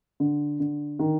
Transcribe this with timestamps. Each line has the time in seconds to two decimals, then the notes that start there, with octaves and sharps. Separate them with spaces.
0.20 D3
0.60 D3
0.99 D#3